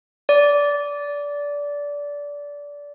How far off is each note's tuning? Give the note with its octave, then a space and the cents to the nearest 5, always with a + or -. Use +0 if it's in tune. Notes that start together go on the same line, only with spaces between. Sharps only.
D5 -20